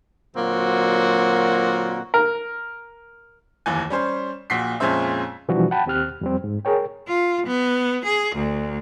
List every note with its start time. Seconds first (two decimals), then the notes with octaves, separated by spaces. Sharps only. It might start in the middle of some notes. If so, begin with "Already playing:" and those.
0.36 A#2 D3 F#3 A#3 C4 F#4
2.14 A#4
3.66 F1 D#2 E3 G#5
3.90 G3 C#4 C5
4.50 A#1 A#2 F#4 B6 C7
4.80 F2 A#2 G#3 C#4 C5 E5
5.48 B2 E3 F3 G3 D4 F#4
5.71 F#5 G5 A5 B5
5.86 D#2 C4 G4 F6 F#6
6.21 F2 G3 C4
6.44 G#2
6.65 G#4 A#4 C#5 G5
7.08 F4
7.47 B3
8.06 G#4
8.36 D2